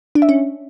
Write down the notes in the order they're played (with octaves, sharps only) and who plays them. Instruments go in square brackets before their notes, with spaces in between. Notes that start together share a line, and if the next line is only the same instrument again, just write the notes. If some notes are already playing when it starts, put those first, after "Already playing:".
[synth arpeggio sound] D4
E5
C#4